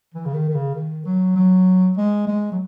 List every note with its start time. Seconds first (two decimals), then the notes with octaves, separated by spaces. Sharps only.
0.14 E3
0.25 C#3
0.34 D#3
0.49 D#3
0.54 C#3
0.74 D#3
1.06 F#3
1.36 F#3
1.97 G#3
2.27 G#3
2.52 F#3